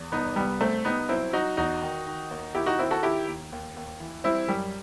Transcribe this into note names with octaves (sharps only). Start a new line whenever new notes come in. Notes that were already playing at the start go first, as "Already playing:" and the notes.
Already playing: E2
C2 B3 D#4
C2 G3 B3
C2 A3 C4
G3 B3 D#4
F#3 C4 E4
F#3 D#4 F#4
E2 D#4 F#4
D#3
D#3
D#2
D#2 E4 G4
D#4 F#4
D#3 C4 E4
F#4 A4
D#3 E4 G4
D#2
D#2
D#2
E3
G3 C4 E4
F#2 G3